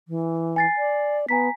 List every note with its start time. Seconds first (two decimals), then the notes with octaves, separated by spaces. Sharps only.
0.08 E3
0.56 G#5 A6 C7
0.78 D5
1.29 B3 G#5 A#5 B6